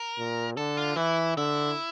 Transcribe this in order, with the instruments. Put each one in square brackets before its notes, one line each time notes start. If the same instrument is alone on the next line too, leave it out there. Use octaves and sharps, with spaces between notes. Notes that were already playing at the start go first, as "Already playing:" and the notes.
Already playing: [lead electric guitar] A#4
[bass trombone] A#2
[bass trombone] D3 [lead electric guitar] A4
[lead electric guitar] F4
[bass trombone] E3 [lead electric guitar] E4
[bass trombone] D3 [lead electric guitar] E4